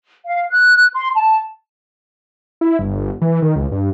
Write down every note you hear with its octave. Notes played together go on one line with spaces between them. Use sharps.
F5
F#6
C6
A5
E4
G1
E3
D#3
C#2
G2